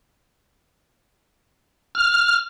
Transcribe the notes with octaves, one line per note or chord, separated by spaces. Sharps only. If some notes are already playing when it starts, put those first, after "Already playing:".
F6